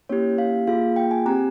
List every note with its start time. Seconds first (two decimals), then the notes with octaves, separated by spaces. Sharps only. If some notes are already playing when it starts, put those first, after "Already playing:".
0.09 A#3 C#4 E4 G4 C#5
0.38 F5
0.67 A#3 F4 G#4 F5
0.96 G5
1.11 G#5
1.26 C4 G4 A#5